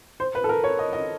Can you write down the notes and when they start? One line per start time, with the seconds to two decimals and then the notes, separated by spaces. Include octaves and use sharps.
0.20 C5
0.35 B4
0.44 A4
0.49 A#4
0.64 C#5
0.79 D#5
0.93 D#5